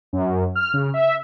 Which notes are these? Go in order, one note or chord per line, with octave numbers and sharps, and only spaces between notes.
F#2
F6
C#3
E5